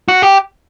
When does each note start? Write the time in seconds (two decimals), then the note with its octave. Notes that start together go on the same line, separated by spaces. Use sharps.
0.08 F#4
0.22 G4